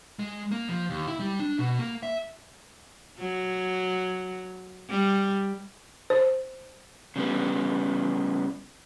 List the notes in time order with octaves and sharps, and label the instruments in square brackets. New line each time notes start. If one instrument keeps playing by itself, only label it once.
[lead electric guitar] G#3
A#3
F3
D#2
E4
G3
D4
B2
A#3
E5
[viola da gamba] F#3
G3
[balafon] C5
[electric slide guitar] C#3 G3 B3